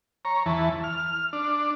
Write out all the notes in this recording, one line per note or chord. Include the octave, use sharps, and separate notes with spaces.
C#5 A#5
E2 E3 A5
F6
D4